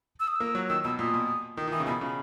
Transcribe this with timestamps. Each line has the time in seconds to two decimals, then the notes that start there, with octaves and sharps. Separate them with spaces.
0.20 E6
0.28 D#6
0.36 A#3 E6
0.55 F#3
0.69 D#3 E6
0.85 B2 E6
0.99 A#2 D#6
1.14 B2
1.57 D#3 D#6
1.67 D#3
1.72 E3 D#6
1.80 C#3
1.87 B2 B5
2.01 C#3